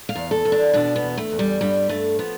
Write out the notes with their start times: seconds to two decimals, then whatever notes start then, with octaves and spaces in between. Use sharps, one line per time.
0.09 F5
0.16 E2
0.31 A4
0.45 E2
0.52 D4
0.73 B2 D4
0.96 B3
1.02 E2
1.17 A3
1.32 E2
1.39 G3
1.61 G2 G3
1.89 G2 A3
2.19 F3 B3